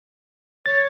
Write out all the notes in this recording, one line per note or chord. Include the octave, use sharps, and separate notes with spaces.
C#5 A6